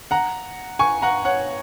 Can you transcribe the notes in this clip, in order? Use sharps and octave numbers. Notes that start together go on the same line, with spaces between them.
F#5 A#5
G#5 C#6
F#5 A#5
C#5 F#5